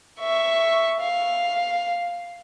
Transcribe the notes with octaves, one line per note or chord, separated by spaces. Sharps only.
E5 C#6
F5